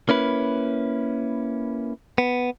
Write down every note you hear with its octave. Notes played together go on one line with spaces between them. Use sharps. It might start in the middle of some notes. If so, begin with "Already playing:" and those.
A#3 C#4 E4 B4
B3